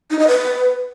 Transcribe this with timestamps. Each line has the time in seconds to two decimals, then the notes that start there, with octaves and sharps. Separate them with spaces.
0.11 D#4
0.19 D#5
0.28 B4